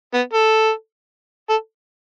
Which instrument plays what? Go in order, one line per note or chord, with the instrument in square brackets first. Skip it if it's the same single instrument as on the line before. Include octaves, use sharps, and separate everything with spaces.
[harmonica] B3
A4
A4